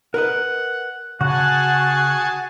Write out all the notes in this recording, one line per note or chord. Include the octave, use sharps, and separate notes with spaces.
A#4 B4 D#5 F#5
C#3 F#4 G#4 F#5 G#5 A5